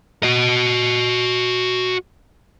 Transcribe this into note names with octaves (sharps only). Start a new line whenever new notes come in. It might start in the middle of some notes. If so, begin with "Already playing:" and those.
F#4 D#5